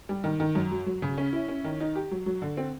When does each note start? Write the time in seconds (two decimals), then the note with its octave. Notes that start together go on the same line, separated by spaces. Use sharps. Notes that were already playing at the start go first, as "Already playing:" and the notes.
0.09 G3
0.24 D#3
0.40 D#3
0.55 F#2
0.72 F#3
0.86 F#3
1.02 C#3
1.18 C#4
1.33 E4
1.48 C#4
1.64 D#3
1.80 D#4
1.95 G4
2.11 F#3
2.26 F#3
2.42 D3
2.57 C4